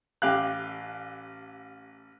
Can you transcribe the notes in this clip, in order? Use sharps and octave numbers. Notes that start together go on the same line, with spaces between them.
A1 G4 F5 F#6